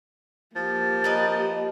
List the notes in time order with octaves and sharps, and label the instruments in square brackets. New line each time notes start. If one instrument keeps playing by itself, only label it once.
[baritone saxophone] F3 [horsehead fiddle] A#3 G4 [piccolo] A6
[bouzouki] A#4 B4 D#5